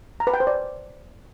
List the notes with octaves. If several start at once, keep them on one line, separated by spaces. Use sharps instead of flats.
A#5
B4
G5
C5
D5